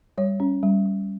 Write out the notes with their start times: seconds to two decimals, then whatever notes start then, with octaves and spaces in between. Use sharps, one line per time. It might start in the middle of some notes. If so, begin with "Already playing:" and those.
0.18 G3 C#5
0.40 C#4
0.63 G3
0.86 G3